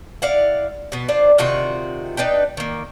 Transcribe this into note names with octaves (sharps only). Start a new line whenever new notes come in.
E4 D5 F5 F#5
B2 B3
D4 F4 C5
C3 D#3 F4 F#4
D4 D#4 B4 G5
D#3 A#3